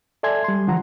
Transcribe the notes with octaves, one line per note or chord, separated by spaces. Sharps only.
A4 D5 E5 G#5 C6 G#6
G3 C6
D3 E3 F3 F#5 A#5